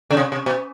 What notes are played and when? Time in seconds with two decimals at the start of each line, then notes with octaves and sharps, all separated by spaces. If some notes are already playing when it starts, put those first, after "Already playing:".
0.11 C#3
0.17 C3
0.32 C3
0.46 B2